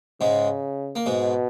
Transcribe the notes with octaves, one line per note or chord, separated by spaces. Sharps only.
G#2 C#3 G#3
A#3
G#2 B2 G#3